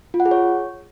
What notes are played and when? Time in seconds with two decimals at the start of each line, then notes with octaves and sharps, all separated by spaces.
0.14 F4
0.20 F#5
0.26 G#4
0.31 C#5